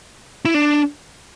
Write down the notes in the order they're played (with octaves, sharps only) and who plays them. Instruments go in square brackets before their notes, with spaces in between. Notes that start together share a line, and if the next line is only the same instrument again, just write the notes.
[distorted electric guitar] E4
D4